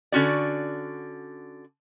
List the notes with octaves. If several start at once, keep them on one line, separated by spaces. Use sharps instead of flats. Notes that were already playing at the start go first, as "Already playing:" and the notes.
D3 C#4 F#4 D5